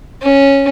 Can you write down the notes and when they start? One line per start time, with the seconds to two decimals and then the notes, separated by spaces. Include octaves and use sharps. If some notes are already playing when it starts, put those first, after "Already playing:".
0.23 C#4